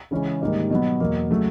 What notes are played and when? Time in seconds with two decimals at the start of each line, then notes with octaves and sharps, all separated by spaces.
0.11 C#3 E3 G#3 C#4
0.41 G#2 D#3 G3 A#3 D#4
0.70 B2 F#3 B3
1.00 E2 B2 F#3 A#3
1.30 C#3 F#3 A3